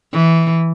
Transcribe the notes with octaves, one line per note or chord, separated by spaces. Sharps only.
E3